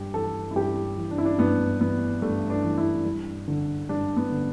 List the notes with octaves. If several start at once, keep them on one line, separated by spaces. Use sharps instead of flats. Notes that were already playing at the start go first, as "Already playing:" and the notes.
Already playing: G2 G4
E3 A4
E4
G2 G4
E3
D4
E4
D4
G2 B3
E3 B3
G2 A3
D4
E3
E4
G2
D3
G2 D4
B3
D3